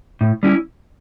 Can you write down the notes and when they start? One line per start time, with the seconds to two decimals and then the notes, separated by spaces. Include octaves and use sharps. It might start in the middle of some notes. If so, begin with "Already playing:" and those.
0.21 A2
0.43 G3 C#4 E4